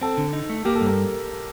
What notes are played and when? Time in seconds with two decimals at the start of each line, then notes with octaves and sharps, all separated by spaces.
0.01 C4 A4
0.17 D3
0.33 D#4
0.49 A3
0.65 A#3 G4
0.75 A4
0.81 G2
0.86 A#4